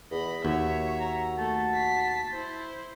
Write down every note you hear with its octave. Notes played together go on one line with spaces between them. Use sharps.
E2 D#5 B5
D#2 F#4 C#5 E5
A#5
A3 A5
B6 C7
E4 C5